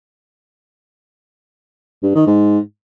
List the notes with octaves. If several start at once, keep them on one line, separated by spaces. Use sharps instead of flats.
G2
D#3
G#2